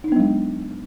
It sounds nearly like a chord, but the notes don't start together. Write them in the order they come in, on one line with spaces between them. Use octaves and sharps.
D#4 D4 B3 F#3 G#3